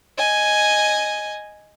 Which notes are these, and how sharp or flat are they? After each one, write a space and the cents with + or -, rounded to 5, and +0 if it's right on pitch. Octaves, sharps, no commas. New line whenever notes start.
D#5 -5 G#5 +0